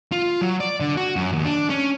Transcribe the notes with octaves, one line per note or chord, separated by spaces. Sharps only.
F4
F#3
D5
D3
F#4
F#2
D#2
D4
C#4